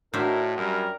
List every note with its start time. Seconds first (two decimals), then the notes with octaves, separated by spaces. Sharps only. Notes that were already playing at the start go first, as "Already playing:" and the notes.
0.13 A2 D4 D#4 F#4 A#4 C5 E5
0.57 F#2 G3 A#4